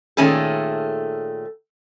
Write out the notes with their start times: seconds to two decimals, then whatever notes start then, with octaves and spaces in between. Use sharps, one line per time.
0.17 A#2 D#3 A3 C#4 G#4 A4